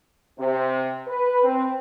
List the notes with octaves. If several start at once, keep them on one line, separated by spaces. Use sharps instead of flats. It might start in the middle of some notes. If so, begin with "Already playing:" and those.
C3
B4
C4